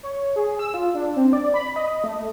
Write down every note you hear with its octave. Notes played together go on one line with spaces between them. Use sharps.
C#5
G#4
E6
F4
D4
C4
D5
B5
D#5
A3